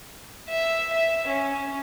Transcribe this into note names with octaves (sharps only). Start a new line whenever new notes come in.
E5
E5
C#4